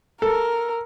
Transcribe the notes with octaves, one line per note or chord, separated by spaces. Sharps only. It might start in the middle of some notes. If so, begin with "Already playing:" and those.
A4 A#4